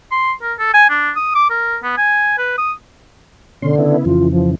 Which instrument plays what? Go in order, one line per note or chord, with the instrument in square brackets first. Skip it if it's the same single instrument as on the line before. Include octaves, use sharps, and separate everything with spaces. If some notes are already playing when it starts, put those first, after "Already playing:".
[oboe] C6
A#4
A4
G#5
D4
D#6
D6
A#4
B3
G#5
B4
D#6
[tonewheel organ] B2 C#4 C6 [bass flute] D3
[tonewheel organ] C#3 B3 E4
[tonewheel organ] F2 C#3 E3 [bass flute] F4
[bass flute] F3